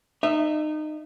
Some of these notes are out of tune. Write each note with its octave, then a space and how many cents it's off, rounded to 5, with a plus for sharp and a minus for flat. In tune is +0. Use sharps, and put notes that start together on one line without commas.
D#4 -25 E5 +0